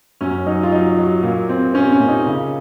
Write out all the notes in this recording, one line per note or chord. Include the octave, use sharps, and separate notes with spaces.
F#2 C#4
F#3 D#4
F4
F#3 D#4
F#3
A#2
C4
C4 C#4
C#4
A#2
D#4
C#3